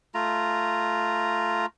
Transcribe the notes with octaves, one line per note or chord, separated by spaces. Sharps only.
A3 F4 A#5